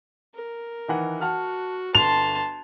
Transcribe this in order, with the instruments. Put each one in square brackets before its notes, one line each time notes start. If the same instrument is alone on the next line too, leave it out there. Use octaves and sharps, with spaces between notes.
[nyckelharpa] A#4
[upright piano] D#3 E3 F#5
[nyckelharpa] F#4 [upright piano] F#5 A5 F6
[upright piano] G1 [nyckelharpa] A5 C6 [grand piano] F7